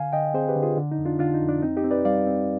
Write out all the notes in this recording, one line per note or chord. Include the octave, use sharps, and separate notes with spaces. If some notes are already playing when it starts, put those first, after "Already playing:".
Already playing: D3 F5 G#5
D3 D#5 G5
C4 G#4 C5
G4 B4
D3
F4 G#4
D3
D#4
F2
D4 F4
D3 D4 F4
D#4
F2
D4
C4 D#4
D#4 G4
C4
B4 D5
G3 D5 F5
C4